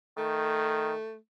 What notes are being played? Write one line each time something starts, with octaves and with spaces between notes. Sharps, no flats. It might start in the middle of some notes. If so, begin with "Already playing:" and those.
D#3 A3